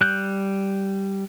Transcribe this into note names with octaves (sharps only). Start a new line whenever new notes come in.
G3 F#6 G6